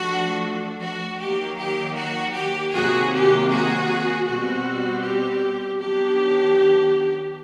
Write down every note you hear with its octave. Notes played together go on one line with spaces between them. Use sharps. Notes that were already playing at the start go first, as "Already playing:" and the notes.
Already playing: F3 A3 D4 F#4
F#4
D#3 F#3 A#3 D#4 G4
G4
F#4
G4
C3 D#3 F#3 A#3 F#4 G#4
G4
F#4 G#4
B2 G3 C4 F#4
G4
D#3 F#3 B3 D4 G4